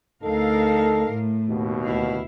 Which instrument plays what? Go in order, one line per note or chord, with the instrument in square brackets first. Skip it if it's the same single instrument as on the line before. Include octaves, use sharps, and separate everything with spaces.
[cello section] D2 A#4 F5 [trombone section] D#4 A4
[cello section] A2
[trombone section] D#2 B2
[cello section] D2 E4 F5